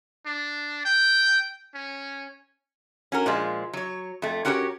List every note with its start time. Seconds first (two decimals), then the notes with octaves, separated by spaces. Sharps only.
0.26 D4
0.85 G5
1.75 C#4
3.12 C#4 F#4 A#4
3.26 A#2 F3 G#3
3.73 F#3 C#5
4.22 F2 A3
4.45 C#4 F#4 G4 A#4 B4 C#5